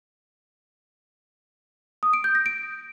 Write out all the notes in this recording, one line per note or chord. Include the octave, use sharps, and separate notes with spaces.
D#6
D7
G6
A#6
D7